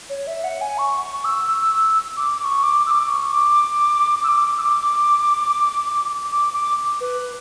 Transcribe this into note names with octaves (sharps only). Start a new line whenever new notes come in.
C#5
E5
F#5
G#5
C#6
C#6
E6
E6
D6
D6
C#6
D6
E6
D6
C#6
D6
E6
D6
E6
D6
D6
D6
B4